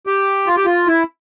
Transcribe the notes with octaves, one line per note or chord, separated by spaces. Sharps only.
G4
F4
G4
F4
E4